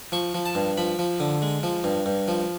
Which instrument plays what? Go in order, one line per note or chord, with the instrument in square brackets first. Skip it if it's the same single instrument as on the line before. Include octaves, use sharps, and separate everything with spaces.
[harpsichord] F3 C#6
F3
A5
G2
F3 B5
F3
D3
G#3
F3
G2
G2
F3